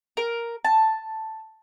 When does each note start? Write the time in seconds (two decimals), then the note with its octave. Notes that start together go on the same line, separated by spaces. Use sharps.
0.17 A#4
0.65 A5